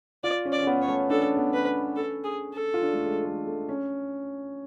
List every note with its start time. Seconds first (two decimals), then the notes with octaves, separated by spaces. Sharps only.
0.24 F4 D5
0.45 C#4
0.52 D5
0.63 C#4
0.67 B3
0.82 C#5
0.88 A3
1.10 D4 A4
1.23 C#4
1.37 B3
1.50 C#4 B4
1.96 A4
2.25 G#4
2.54 A4
2.74 F4
2.83 D4
2.93 A3
3.04 G#3
3.25 A3
3.47 A3
3.69 C#4